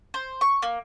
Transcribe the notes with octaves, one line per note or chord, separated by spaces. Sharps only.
C5
C#6
A#3